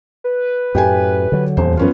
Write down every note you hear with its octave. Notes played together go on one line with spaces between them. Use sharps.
B4
F#2 A2 G4 G5 G#5
D3 F#3
D#1 E2 C5
F#2 E3 B3 C#4 F4